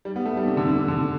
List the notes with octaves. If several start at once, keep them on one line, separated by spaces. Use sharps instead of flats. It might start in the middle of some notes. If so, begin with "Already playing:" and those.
G3
B3
A3
G3
C3
D3
C3
D3